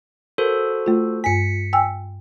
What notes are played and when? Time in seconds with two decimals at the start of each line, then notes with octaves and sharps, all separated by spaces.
0.38 F#4 A4 A#4 C5
0.86 A3 F4
1.24 G2 G#5 B6 C#7
1.73 G5 G#5 E6